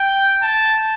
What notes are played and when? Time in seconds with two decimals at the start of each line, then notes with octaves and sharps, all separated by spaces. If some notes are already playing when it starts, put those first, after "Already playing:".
Already playing: G5
0.42 A5